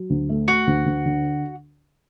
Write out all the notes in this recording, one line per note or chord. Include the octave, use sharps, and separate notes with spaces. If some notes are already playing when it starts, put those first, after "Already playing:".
Already playing: F#3
D2
A3
A3 F#4
D2
D2
D3